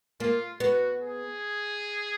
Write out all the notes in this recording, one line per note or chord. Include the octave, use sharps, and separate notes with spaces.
A#3 F4
B3 F#4
G#4